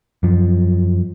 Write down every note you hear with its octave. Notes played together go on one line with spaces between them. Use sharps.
F#2 F3